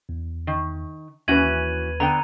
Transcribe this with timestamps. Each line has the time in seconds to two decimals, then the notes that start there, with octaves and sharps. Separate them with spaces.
0.09 E2
0.47 D#3
1.28 D#2 E3 C#4 F#4 B4 G#6 D#7 F#7
2.00 D3 B3 G5 A#5